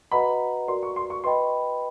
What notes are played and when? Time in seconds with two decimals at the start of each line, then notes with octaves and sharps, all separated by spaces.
0.12 F#4 B4 D#5 F#5 A#5 B5
0.68 F#4 A#4 D5 C6
0.83 C#6
0.96 C6
1.10 C#6
1.24 B4 D#5 G5 B5 C6